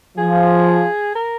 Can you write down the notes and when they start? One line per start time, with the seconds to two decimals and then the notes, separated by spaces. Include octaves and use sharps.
0.17 F3 G#4
1.15 A#4